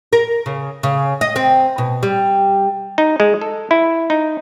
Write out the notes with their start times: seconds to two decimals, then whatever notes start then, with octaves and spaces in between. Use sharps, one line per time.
0.13 A#4
0.46 C#3
0.83 C#3
1.21 D#5
1.36 C4
1.78 B2
2.03 G3
2.98 D#4
3.20 G#3
3.41 A4
3.71 E4
4.10 D#4